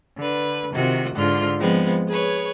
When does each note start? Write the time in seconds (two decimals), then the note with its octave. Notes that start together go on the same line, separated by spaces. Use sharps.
0.18 D3 B4
0.74 C3 D#3 F4 F#4
1.17 G#2 D3 F4 C6 F6
1.59 F3 G#3 B3 C4
2.09 G#4 B4 C#5